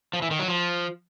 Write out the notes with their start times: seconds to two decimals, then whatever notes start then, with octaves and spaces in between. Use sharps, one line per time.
0.13 F3
0.22 E3
0.31 D#3
0.40 F#3
0.48 F3